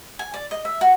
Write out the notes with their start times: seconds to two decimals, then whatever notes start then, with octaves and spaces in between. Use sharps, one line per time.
0.19 G#5
0.34 D5
0.51 D#5
0.65 E5
0.81 F#4